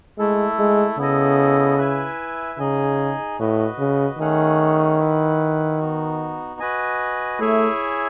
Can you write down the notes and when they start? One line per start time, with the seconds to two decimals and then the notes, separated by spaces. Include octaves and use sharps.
0.18 G#3 A3 E4 A4
0.59 G#3
0.98 C#3 B3 E4 A4 D#5
1.78 E4 B4 E5 G#5
2.59 C#3 D#4 G#4 D#5 G#5
3.39 A2 F#4 B4 D#5
3.79 C#3
4.19 D#3 A3 C#4 G#4 C#5 F#5
4.99 E4 B4 F#5
5.80 B3 D#4 F#4
6.60 F#4 B4 D#5 G#5
7.39 A3 E4 G#4 C#5 E5 G#5